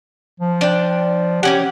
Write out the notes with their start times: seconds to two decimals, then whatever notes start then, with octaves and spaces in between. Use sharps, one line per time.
0.40 F3
0.61 D4 G5
1.43 E3 C#4 G4 F#5